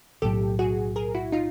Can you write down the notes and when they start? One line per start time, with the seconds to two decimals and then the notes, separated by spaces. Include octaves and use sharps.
0.22 B1 A2 F#3 G4 A4
0.59 F#4 G#4
0.96 G#4 A#4
1.15 E4 F#4
1.32 D#4 F4